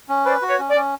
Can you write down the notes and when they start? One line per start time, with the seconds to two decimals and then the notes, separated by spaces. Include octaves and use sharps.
0.09 C#4
0.25 B4 C5 D5
0.42 F#4
0.47 B4 C#5
0.59 C#4
0.70 D5
0.76 C#4